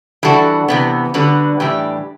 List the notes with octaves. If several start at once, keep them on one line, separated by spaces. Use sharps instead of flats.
E3 G3 D4 F#4 A4
C3 E3 B3
D3 G3 D4 F#4 B4
A2 E3 G3 D4 G4